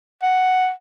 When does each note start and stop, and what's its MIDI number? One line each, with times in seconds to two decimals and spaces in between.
0.22 0.70 78